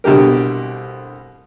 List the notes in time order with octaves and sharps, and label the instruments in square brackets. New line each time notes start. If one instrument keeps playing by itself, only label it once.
[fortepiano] C2 B2 D3 G4 A#4